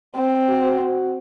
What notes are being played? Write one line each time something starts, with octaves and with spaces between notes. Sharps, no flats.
C4
F#4